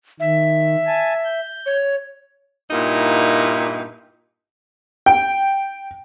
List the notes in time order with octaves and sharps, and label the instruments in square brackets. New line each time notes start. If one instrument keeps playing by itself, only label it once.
[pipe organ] D#3 [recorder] E5
[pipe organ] G#5 A5
G6
[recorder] C#5
[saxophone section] G2 A#2 A#3 D#4 E4
[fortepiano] G5